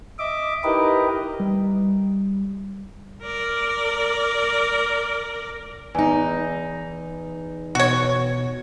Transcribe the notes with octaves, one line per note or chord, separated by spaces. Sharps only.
D#5 E5 D6
D#4 E4 G4 A#4 B4 D#5
G3
A#4 D5
E2 D#4 G#5
B2 F#4 C#5